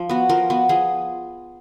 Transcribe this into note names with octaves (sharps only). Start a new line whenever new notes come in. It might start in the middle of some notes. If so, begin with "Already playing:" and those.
Already playing: F3
B3 F#4
F3 A#4
B3 F#4
F3 G#4